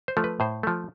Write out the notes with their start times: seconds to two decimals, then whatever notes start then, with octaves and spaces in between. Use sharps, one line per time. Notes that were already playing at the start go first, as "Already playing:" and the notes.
0.08 C5
0.17 F3 A3
0.24 B4
0.40 A2 C5
0.63 F3 A3